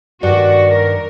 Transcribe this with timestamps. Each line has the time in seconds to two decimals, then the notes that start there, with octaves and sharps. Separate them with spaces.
0.23 G2 D#3 F#4 D5
0.68 A#4